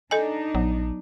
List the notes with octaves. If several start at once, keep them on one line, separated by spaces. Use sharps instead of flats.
D4 D#4 A4 D#5 G#5
A#1 F#3 B3